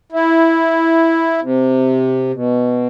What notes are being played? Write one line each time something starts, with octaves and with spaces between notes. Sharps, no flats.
E4
C3
B2